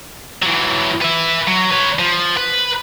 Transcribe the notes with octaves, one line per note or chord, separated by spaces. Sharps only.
E3 F#3
B4 E5
F#3
B4 C#5
F3
B4